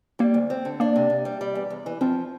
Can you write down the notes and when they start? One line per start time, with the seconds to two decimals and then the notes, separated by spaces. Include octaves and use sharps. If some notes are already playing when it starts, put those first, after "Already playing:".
0.19 G3 A#3
0.34 D2
0.50 C4
0.65 D3
0.80 A#3 D4
0.96 C3
1.10 C3
1.25 G3
1.41 G3
1.55 E2
1.70 E2
1.86 E3
2.01 F3 C4